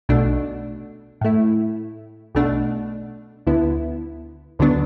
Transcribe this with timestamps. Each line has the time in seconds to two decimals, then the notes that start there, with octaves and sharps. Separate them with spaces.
0.09 B1 B2 A3 D4
1.21 A2 A3 E4
2.35 B1 B2 A3 D4
3.47 D2 D3 B3 E4
4.59 D2 D3 F#3 B3 D4